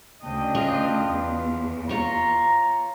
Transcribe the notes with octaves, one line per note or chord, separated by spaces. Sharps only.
D2 C#3 D4 D#5 G5
F4
E2
F4 C#5 A#5